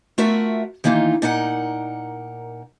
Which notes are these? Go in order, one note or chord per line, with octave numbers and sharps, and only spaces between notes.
A3 F4 F#4 A#4 E5
D#3 E3 A#3 D#4 F4
A#2 D#4 A#4 F#5